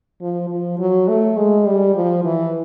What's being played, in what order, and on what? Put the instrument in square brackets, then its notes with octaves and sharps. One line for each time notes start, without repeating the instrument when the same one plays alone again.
[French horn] F3
F3
F#3
A3
G#3
G3
F3
E3